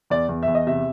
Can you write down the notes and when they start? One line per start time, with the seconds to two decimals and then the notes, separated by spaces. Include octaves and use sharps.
0.10 E2 D5
0.29 E2
0.43 E5
0.48 E2
0.55 D#5
0.67 C3 E5